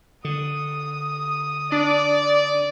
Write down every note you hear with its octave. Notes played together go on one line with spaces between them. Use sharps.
D3 D#6
D4 D5